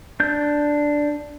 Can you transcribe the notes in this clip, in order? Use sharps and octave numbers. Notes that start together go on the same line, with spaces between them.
D4 G6